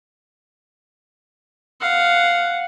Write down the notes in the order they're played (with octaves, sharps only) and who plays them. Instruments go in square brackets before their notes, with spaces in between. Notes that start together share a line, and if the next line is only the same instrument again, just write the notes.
[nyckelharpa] F5 F#5